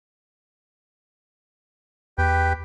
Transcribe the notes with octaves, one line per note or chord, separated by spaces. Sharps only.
E2 G4 B4 G5